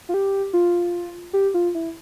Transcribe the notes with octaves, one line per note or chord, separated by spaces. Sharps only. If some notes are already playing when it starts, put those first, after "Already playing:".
F4
G4
F4
G4
F4
E4